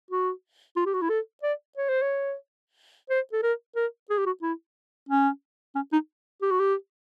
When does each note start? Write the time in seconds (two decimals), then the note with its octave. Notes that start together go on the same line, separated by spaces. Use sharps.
0.10 F#4
0.76 F4
0.86 G4
0.94 F#4
1.02 E4
1.09 A4
1.43 D5
1.77 C#5
1.89 C5
2.02 C#5
3.10 C5
3.33 A4
3.43 A#4
3.76 A#4
4.10 G#4
4.17 G4
4.26 F#4
4.42 E4
5.09 C#4
5.75 C#4
5.93 D#4
6.42 G4
6.51 F#4
6.60 G4